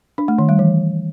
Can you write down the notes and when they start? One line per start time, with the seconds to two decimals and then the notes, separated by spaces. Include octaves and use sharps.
0.18 D4
0.28 A3
0.39 D#3
0.49 G3
0.59 E3